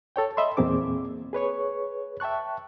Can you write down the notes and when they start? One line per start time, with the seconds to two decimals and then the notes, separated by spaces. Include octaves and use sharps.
0.16 A4 C#5 G5
0.37 D#5 E5 B5 C6
0.57 E2 A#2 A#3 C4 G#4 D6
1.33 G#4 B4 C#5 C#6
2.20 E5 G5 A5 C#6 F#6